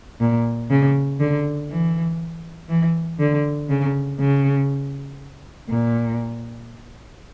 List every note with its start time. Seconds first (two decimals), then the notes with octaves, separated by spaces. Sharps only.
0.21 A#2
0.70 C#3
1.20 D3
1.70 E3
2.69 E3
3.19 D3
3.69 C#3
4.20 C#3
5.69 A#2